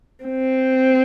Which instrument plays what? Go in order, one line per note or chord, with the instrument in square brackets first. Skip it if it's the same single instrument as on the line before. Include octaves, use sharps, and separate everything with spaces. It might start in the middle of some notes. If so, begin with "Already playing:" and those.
[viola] C4